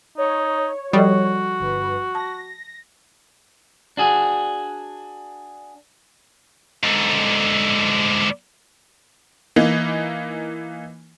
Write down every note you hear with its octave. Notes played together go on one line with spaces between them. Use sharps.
D#4 C#5
F3 G3 F#4 A4 D#5
G1 B4
A5 A#6
D4 F#4 G#4
G#2 D3
E3 A#3 D#4